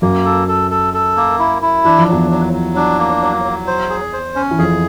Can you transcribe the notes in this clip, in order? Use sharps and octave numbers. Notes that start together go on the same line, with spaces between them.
F#2 F#3 A#3
A4
A4
A4
A4
A#3
E4
E4
E3 D4
F3
E2 E3 F#3
F#3
F#3
D4
A#3
F#3
F#3
C5
G#4
C5
C#4
E3
F2 F3 G#4